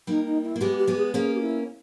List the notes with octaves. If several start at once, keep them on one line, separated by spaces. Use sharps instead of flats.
G3 A#3 D#4
D#4
E4
A#3
G#3 B3 G4
G4
G#3 B3
G#4
A#3 C#4 G#4
G4
E4